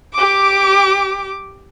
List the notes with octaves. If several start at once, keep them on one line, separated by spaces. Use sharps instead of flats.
G4 D6